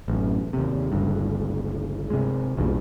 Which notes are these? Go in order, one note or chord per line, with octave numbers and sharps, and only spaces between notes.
A1 F#2
D#2 C3
G1 C#2 G2
C3 G#3
B1 E2 G2 A#2